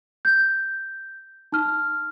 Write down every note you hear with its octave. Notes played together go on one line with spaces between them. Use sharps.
G6
D#4 F6